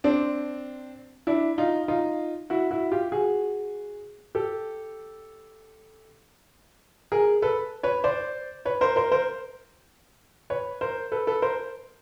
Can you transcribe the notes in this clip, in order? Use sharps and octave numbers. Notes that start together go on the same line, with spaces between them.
C4 D4
D4 E4
D#4 F4
D#4 F4
E4 F#4
E4 F#4
F4 G4
F#4 G#4
G4 A4
G#4 A#4
A4 B4
B4 C#5
C5 D5
B4 C#5
A#4 C5
A#4 C5
A#4 C5
B4 C#5
A#4 C5
A4 B4
A4 B4
A#4 C5